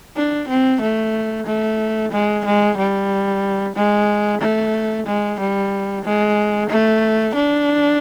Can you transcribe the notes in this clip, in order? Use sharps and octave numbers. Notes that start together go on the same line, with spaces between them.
D4
C4
A3
A3
G#3
G#3
G3
G#3
A3
G#3
G3
G#3
A3
D4